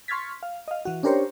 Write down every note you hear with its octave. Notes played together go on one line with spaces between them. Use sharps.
C6 C#6 F6 G#6 A6 B6
F5
D#5 F5
E3 F#4
C#4 D4 G4 A#4 C5 C#5